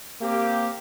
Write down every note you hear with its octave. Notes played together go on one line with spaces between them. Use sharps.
A#3 C4 G4